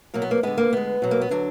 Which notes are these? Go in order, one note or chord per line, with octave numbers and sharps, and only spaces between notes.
B2 F#3 A#3
B3
A#3
D3 G#3 B3
A#3
D3 G#3 B3
B2 F#3
A#3
B3
D3 F#3 D4